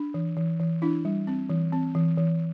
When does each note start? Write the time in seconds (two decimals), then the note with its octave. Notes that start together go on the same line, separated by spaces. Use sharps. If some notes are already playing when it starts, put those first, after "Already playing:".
Already playing: D4
0.14 E3
0.37 E3
0.60 E3
0.82 D4 E4
1.05 G3
1.27 C4
1.50 E3
1.73 C4
1.95 E3
2.18 E3